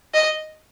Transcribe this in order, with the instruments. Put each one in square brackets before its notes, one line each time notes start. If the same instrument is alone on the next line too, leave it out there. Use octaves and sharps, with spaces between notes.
[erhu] D#5